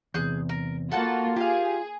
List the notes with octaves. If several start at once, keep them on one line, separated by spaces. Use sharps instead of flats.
E2 C3 G#4 F#6 G6
A#4
A#3 F4 F#4 A4 F#5 A5
F4 G4 G#4 F5